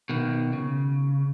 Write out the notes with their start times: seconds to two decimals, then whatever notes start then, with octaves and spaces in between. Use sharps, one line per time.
0.09 B2 D#3
0.53 C#3